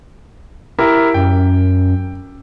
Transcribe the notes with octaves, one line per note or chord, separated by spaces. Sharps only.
E4 G4 A#4
F#2 G5